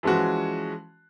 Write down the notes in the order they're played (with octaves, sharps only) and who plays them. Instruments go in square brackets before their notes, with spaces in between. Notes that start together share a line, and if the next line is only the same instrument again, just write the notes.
[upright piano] E3 F3 G#3 C#4 F#4